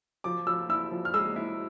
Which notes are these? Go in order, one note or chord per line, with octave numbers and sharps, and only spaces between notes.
F3 D6
F3 E6
E4 E6
F3
F6
G#3 E6
E4